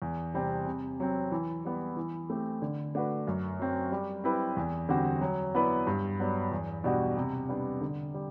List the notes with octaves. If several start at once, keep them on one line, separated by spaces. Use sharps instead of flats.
E2
C3 G3 C4
C3
F#3 C4
E3
G3 B3
E3
A3 C4 G4
D3
A3 D4 F#4 B4
F#2
F#3 C4
G3
C4 E4 G4 B4
E2
D3 G3 C4 F#4
F#3
B3 E4 B4 D5
G2
F#3 B3 D4
E2
B2 G3 D4 F#4
C3
G3 B3 D4
D3
G3